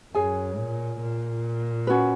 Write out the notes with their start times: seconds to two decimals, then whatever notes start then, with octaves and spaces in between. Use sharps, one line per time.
0.13 F#2 G#4 C#5 G#5
0.57 A#2
1.01 A#2
1.87 C#4 F#4 B4